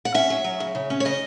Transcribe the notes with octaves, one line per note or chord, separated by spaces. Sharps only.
F#5
C#4 E5
F#3
F#3
C#3
C#3
C#4
C#5
C#3 D#5